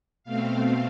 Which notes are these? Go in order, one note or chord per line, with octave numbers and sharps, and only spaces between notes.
B2 A3 C4 F5